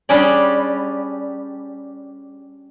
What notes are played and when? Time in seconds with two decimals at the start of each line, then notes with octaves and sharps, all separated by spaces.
0.09 G3 C#4 D4 G#4 D5